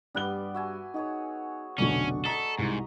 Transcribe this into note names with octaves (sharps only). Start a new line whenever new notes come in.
G2 G3 B3 D6 F#6 G7
F#4 E5 G#5
D#4 F#4 G#4 C#5
F1 B1 D3 C#4 D4 C#6
A4 D#5 A#5 C#6 B6 G7
C2 G#2